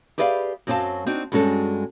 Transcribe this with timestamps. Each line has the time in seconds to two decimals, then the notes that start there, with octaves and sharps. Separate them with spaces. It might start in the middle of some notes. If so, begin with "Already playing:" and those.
0.18 G4 G#4 B4 D5 E5 F5
0.67 F#2 F#3 C4 G4 F5 A5
1.06 C4 D4 D#4 F#4
1.32 G2 G#3 C#4 F#4 A4